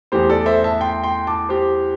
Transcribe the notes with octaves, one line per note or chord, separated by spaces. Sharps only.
E2 E3 A3 G4 C5
A4 D5
C5 E5
E5 A5
G5 C6
G5 C6
A5 D6
G4 C5